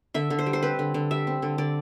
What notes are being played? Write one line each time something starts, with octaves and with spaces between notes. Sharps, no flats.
D3 E5
D3
C5
G3
C5
C4 B4
D3
D3
G3 E5
C4
D3
D3 D5